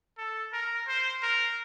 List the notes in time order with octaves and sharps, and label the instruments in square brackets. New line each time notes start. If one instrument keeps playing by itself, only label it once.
[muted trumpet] A4
A#4
C5
A#4